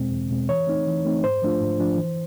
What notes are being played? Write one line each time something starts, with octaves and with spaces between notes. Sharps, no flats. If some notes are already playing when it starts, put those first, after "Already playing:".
Already playing: E2 B2 G#3 C4
E2
B2 G#3 C4
E3 C#5
A3 C4 D#4
E3
A3 C4 D#4
G#2 C5
F3 A3 D4 F4
G#2
F3 A3 D4 F4
E3